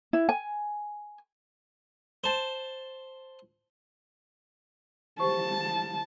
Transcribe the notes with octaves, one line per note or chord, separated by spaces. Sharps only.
E4
G#5
C5 A5
G4 C5 A5 C#6